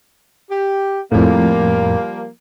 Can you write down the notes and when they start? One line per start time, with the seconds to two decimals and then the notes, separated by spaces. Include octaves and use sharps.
0.50 G4
1.12 F2 A2 F3 G3 A#3